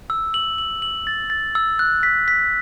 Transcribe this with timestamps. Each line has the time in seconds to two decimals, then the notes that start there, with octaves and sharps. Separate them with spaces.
0.10 E6
0.34 F#7
0.58 F#7
0.82 F#7
1.07 A6
1.30 A6
1.55 E6
1.79 F#6
2.03 B6
2.28 B6